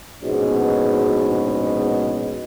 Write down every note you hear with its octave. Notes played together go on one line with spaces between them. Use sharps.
A#1 G#2 B2 G#3 B3 C#4